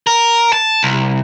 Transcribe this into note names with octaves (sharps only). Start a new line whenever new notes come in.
A#4
A5
C2